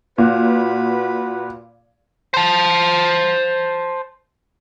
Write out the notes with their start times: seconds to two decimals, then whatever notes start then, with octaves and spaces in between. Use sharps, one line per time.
0.18 A#2 F#4 B4
2.34 C5 A5